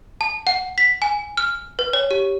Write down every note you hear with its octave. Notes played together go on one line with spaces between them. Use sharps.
A5
F#5
B6
G#5
F6
B4
C#5
G4